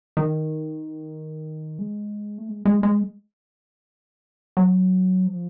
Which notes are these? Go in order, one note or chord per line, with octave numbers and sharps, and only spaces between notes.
D#3
G#3
A3
G#3
G#3
G#3
F#3
F3